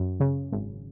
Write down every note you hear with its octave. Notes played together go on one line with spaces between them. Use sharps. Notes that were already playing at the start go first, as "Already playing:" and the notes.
Already playing: F#2
C#3
G#1